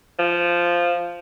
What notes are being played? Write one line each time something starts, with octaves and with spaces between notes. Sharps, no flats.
F3